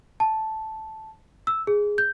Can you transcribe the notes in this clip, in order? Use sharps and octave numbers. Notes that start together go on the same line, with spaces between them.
A5
E6
G#4
G6